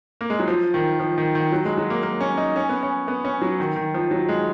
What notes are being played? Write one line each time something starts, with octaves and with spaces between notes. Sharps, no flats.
A#3
G#3
F#3
F3
D#3
F3
D#3
D#3
F#3
G#3
F#3
A#3
A#3
C#4
D#4
C#4
B3
C#4
B3
C#4
F#3
D#3
D#3
F3
F#3
G#3